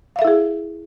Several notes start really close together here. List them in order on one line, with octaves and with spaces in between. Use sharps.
F5 E5 A4 E4 G#4